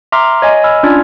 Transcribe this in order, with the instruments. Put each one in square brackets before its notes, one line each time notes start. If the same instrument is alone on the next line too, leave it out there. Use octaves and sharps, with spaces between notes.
[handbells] E5 A#5 C6 D6 F6
C#5 D#5 G#5
G#5 B5 E6 F6
C#4 D4 F4 D5 F6 G#6